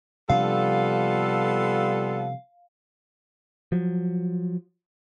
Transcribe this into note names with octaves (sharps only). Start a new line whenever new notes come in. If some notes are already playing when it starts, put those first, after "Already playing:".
C3 F3 G3 B3 D4 F4 A4 F5
F3 F#3